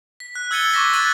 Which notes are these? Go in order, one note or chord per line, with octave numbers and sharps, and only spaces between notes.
B6
F#6
E6 G#6 A6 C#7 D#7 G7
C#6 D6 A#6 B6
F#6 A6 D#7 F#7